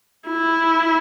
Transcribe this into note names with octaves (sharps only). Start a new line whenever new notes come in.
E4